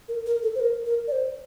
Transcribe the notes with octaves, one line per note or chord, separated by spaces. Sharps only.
A#4
A#4
A4
C5
A#4
A#4
D5
C5